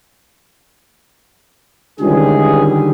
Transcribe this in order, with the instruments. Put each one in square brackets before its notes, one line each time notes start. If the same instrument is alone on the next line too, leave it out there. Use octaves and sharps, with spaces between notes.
[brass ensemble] C#2 G#4 [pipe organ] D3 D#3 G3